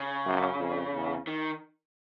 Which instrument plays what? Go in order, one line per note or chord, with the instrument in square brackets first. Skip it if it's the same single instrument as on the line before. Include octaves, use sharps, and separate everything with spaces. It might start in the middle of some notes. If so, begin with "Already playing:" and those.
Already playing: [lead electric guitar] C#3
[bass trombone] F#2
F2
E2
[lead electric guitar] D#3